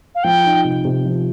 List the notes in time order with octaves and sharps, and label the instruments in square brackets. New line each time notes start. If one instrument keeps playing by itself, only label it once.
[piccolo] F5
[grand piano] F3 [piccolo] G5
[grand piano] D#4
C3
C3
F3